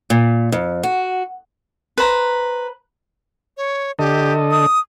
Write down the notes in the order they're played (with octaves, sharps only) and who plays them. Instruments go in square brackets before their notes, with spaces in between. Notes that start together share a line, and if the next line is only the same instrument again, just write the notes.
[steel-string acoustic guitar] A#2
F2
F#4
[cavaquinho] B4 C5 A#5
[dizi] C#5
[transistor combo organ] D3 A4 D#5 [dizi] G4
[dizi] D#6